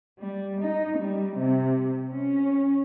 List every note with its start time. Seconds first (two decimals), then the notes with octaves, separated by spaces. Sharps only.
0.20 G3
0.62 D#4
0.96 G3
1.37 C3
2.11 C#4